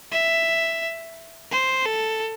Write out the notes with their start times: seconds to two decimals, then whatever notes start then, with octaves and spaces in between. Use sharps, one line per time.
0.12 E5
1.52 C5
1.86 A4